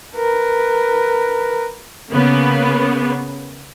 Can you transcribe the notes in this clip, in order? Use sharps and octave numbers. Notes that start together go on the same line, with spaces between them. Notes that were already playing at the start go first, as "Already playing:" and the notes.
A#4 B4
C#3 A#3 B3